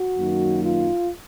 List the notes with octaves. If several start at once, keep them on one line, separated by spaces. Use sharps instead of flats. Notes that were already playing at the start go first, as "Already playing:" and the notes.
Already playing: F#4
F#2 D#3 F#3 A#3 D#4
F4